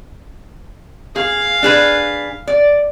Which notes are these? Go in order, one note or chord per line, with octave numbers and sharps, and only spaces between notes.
G#4 F5
D4 G#4 B4
D5